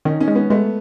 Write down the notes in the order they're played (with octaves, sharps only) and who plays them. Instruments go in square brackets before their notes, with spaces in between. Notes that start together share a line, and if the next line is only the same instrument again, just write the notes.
[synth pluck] D#3 [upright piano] C#4 D#4
[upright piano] C#4 D#4
[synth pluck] G#3
[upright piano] B3 C#4
[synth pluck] G#3 [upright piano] A3 B3